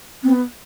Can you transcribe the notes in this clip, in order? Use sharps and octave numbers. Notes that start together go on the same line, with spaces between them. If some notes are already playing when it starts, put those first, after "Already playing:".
B3 C4